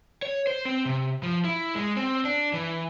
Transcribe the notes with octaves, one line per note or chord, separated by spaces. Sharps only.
C#5
C5
C4
C3
F3
E4
G#3
C4
D4
E3